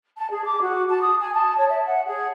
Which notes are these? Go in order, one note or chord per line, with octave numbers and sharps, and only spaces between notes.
A5
G#4
D6
F#4
A5
D#6
G#5
A5
C#5
E5
F#5
G#4